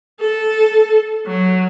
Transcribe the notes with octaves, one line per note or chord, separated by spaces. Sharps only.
A4
F#3